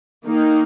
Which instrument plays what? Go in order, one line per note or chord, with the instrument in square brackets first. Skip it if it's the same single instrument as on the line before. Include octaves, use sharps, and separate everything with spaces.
[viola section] D#3 A#3 D#4